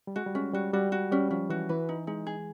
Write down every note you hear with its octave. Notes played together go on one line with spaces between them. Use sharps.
G3
G#3 F#4
G3
G#3 C#4
G3 F#4
G3 F#4
F#4
G3 C#4
F3 C#4
E3 F#4
E3 B4
D#4
G#3 D#4
G#4